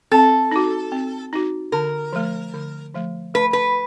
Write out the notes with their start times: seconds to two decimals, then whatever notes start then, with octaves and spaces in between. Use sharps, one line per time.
0.11 C4 A4
0.51 D#4 F#4
0.92 C4
1.33 D#4 F#4
1.72 D3 A#4
2.13 F3 A3
2.54 D3
2.94 F3 A3
3.34 A3 B4
3.53 B4